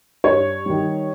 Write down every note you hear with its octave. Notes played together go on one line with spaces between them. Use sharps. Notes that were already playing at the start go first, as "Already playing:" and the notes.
G2 C#5
D#3 G3